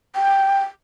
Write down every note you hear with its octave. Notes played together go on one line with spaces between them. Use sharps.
G5